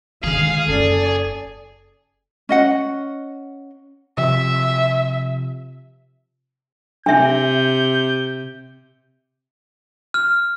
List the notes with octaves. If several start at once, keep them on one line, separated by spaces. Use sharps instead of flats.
D3 D#3 G#3 G#4 F5
F#1 D#4 A4 D5
C#4 D#5 F#5
C3 F3 E5
C3 D4 E5 G6
F6